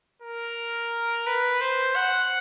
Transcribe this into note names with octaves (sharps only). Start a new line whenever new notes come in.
A#4
B4
C5
F#5